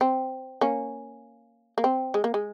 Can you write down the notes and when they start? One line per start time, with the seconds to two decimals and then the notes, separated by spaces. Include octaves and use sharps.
0.01 C4
0.61 A#3 C#4
1.78 A#3
1.84 C4
2.14 G#3
2.24 A#3
2.34 G#3